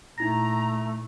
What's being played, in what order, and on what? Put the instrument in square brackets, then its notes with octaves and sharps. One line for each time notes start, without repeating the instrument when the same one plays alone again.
[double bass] A#2 [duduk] A3 [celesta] D#4 E4 A#6 [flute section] A#5